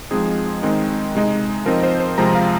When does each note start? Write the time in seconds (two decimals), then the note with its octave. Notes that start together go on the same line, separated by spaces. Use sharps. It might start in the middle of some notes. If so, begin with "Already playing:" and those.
0.11 F3 G#3 C4 D#4 G#4
0.63 D#3 G#3 C4 D#4
1.15 C3 G#3 D#4
1.66 F3 C4 D#4 A#4
1.83 C5
2.00 C5
2.18 C3 F3 G#3 C4 A#5
2.35 F5